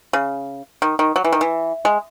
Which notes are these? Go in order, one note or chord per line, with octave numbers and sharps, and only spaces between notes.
C#3
D#3
D#3
F#3
E3
D#3
E3
G#3